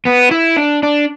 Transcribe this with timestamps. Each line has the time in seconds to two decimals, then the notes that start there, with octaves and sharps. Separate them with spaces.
0.07 B3
0.31 E4
0.57 D4
0.83 D4